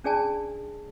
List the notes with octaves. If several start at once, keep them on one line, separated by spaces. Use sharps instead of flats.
C#4 D4 G#4 D5 G#5 A5